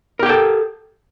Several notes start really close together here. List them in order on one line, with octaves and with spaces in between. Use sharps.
A#4 G4 G5 A4